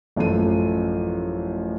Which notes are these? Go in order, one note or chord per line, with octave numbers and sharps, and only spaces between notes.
A1 F#2 F3 A4 D#7